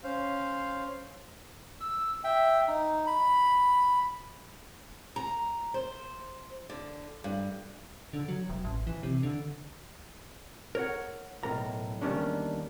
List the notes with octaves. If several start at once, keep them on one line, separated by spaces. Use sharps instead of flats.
C#4 C5 F5
E6
E5 G5
D#4
B5
A#5
C5
D3
G2
D3
F#3
E1
A1
E3
C3
D3
A#4 C#5 F#5
B1 A2 F3 A#4 A#5
E2 D#3 G3 A#3 C#4 D4